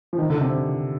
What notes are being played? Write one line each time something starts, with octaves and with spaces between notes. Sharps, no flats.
F3
D#3
D3
C3